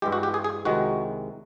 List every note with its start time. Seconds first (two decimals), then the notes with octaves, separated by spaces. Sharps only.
0.02 G2 E3 G#3 G4
0.12 F#4
0.23 G4
0.34 G#4
0.44 G#4
0.65 C2 C3 D#3 G#3 F#4